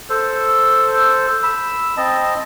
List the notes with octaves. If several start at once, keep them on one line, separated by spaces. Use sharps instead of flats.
A4 C5
B5 E6
C4 D#5 A5